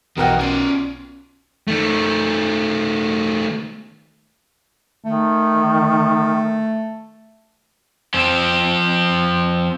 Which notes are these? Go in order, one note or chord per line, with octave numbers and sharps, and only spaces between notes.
B1 B2 D#3 E3 G4 A#4 D#5 F#5
C#4 F4 D5
D#3 A3
D#3 A3
F3 C4